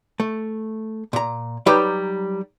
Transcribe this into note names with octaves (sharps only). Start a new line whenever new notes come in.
A3
A#2 A#5
F#3 G3 D#4 G4 B4